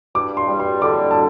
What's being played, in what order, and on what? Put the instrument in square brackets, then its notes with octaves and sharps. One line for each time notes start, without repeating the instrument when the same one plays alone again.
[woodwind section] G2 [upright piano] D6
[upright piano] C6
[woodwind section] G3
[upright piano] C6
[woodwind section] D3 [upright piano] D6
[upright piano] A5